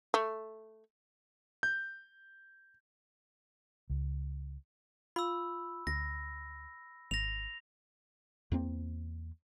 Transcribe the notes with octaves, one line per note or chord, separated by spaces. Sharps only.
A3
G6
C#2
F4 B5 E6
D2 A#6
G#1 A#6 F7
E2 A#3 C4